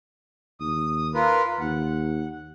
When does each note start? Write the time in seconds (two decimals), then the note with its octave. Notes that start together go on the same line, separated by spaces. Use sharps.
0.60 D#2 D#6
1.14 F4 A#4 B4
1.60 D#2 F#5